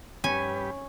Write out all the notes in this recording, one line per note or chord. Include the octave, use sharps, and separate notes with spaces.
G2 C#4 G4 B4 G#5